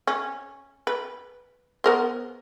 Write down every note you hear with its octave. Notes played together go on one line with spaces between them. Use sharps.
C#4
B4
B3 A#4 C5